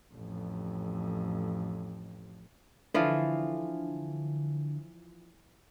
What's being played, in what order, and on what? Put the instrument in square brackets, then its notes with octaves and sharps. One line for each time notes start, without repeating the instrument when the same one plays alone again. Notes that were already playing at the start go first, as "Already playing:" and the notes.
[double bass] A1 F2
[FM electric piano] D3 [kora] E3 F3 F4